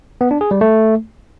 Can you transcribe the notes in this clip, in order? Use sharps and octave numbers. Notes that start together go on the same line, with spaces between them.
B3
D4
G#4
G3
A3